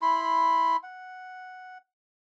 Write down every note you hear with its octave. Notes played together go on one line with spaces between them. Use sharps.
E4 B5 C6
F#5